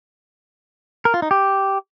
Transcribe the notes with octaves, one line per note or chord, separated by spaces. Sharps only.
A#4
F4
D#4
G4